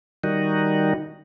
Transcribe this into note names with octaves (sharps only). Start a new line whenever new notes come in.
D#3 G3 D#4 F#4